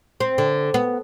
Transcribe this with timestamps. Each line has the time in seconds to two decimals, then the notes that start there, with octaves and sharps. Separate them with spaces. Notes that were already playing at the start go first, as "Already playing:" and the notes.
0.20 C4
0.38 D3
0.74 B3